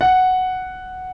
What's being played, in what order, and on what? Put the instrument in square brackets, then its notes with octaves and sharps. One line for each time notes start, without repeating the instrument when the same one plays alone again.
[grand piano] F#5